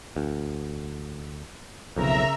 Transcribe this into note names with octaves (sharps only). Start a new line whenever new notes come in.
D2
B1 F2 C#3 A#4 E5 A#5